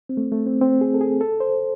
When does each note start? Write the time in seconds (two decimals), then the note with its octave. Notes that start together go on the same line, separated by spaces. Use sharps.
0.09 C4
0.17 A3
0.32 A3
0.47 C4
0.61 C4
0.81 G#4
0.94 A4
1.01 G#4
1.21 A4
1.40 C5